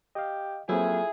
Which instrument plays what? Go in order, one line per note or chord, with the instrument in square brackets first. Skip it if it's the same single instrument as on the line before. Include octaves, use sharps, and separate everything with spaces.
[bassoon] G4 [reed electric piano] D#5 F5
[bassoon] F2 [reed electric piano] F#3 A#3 C4 [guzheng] E4 [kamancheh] G#4